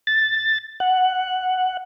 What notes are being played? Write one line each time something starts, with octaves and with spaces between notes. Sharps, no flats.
A6
F#5